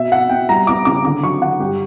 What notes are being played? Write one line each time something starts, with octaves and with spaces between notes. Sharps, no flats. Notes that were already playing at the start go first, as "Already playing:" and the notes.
Already playing: B2 E5
B2 F#5
B2 G5
G3 A#5
B3 D6
C#3 D6
D3 D6
F#3 C#6
D3 F#5
G2 G4